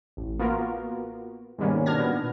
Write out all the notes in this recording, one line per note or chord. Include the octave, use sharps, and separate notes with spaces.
A1
A#3 B3 F4 F#4 A#4
G#2 B2 D#3 G3 A#3 C#4
B2 D4 F6 G#6 A#6
A#2 B3